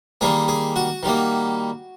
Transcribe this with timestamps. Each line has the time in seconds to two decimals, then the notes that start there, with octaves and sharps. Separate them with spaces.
0.21 D#3 G3 A#3 G#4
0.48 G#4
0.76 F#4
1.03 D#3 G3 A#3